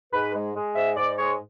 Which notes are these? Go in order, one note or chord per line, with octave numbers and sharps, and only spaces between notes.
G#2 B4
G#3
G#3
G#2 E5
G#2 D5
G#3 C#5